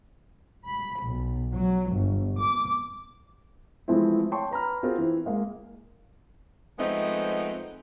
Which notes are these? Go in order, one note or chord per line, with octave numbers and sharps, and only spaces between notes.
B5
B1
F#3
G1
D6
E3 F3 G#3 A3 C4 E4
C#5 G5 A5 C6 C#6
B4 A#5 B5 F6
C4 F4 F#4 G#4 A#4
E3 C4
G#3 A#3 F5
F3 G#3 A3 B3 C4 D#4